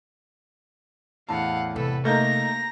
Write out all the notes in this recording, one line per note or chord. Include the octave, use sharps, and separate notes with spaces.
E2 A2 F5 F#5 A5
C3 A4 B4
A3 A#3 D#4 A#5 G6 A#6